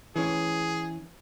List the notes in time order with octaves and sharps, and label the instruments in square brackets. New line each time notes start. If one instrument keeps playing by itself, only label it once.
[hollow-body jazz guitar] E3 C#4 [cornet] G#4